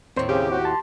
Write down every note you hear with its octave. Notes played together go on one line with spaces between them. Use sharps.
D#2 A2 C4 C5 C#5
C#3 G4
F#4
A5 C6